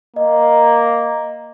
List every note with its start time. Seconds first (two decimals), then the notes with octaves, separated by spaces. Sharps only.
0.16 A#3 D#5